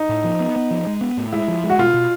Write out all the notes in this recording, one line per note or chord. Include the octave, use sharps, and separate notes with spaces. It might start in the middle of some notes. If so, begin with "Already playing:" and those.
Already playing: D#4
A2
F3
B3
B3
F3
G#3
B3
A2
G#3 E4
F3
G#3
F#4
B2 F4
B2